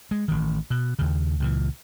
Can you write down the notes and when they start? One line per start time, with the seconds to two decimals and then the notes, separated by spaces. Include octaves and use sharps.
0.11 G#3
0.28 A1 D#3
0.70 B2
0.99 D#2 C#3
1.40 C#2 A#2 E3